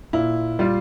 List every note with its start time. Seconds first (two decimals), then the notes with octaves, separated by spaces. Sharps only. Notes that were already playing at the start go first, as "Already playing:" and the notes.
0.13 A#2 E4
0.59 G3 F4